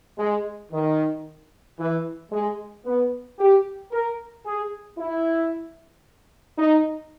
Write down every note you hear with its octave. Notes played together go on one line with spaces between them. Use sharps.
G#3
D#3
E3
G#3
B3
G4
A#4
G#4
E4
D#4